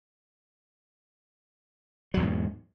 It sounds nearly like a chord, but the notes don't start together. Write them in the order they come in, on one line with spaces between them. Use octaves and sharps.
F#3 E2 B2 G#2